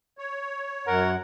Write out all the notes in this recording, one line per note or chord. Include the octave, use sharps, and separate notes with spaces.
C#5
F#2 A#4 F#5